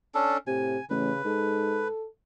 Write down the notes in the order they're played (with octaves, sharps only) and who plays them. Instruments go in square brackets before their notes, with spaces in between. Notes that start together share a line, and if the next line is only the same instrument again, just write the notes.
[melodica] C#4 D4 A4
[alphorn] A2 [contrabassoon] C3 [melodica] G#5
[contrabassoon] A1 [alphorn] C#3 [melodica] B4
[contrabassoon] G#2 [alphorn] A4